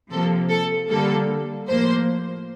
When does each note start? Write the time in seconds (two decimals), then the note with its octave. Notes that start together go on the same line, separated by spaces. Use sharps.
0.11 C3 F3 A#3 A4
0.51 A4
0.90 D3 G3 A#3 A4
1.68 A2 F3 A#3 C5